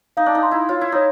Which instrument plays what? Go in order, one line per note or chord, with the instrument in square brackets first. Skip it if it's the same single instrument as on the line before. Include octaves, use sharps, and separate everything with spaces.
[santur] D#4 [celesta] F5
[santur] D4
D#4
[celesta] C6
[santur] E4
[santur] F4 [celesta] C#5
[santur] E4
[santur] D#4 [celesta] C#5